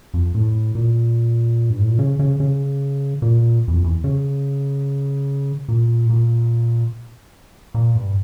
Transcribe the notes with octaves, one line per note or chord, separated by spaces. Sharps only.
F2
A2
A#2
G2
A2
A#2
C#3
C#3
C#3
A#2
E2
F2
E2
C#3
A#2
A2
A#2
A#2
G2